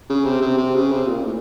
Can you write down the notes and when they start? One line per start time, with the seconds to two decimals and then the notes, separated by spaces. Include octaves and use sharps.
0.09 C#3
0.25 C3
0.42 C3
0.58 C3
0.75 C#3
0.92 C3
1.07 A#2
1.25 A2